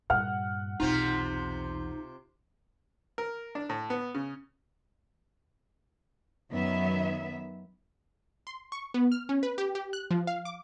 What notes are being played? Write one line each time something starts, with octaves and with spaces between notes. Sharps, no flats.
G2 A#2 F#5 F6
B1 E2 C3 C4 D#4 F4
A#4
D4
A2
B3
C#3
F#2 D#3 F#3 B3 E5
C6
C#6
B3
F6
C#4
B4
G4
G4
F#6
F3
F5
D6